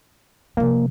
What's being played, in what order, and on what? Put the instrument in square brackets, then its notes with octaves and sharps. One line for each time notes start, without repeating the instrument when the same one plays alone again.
[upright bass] C3 F3 [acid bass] A#3